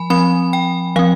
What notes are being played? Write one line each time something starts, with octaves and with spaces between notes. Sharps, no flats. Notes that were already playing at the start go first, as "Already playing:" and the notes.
Already playing: F3 G#5 B5
F3 C4 B5
G5
F3 C4 F5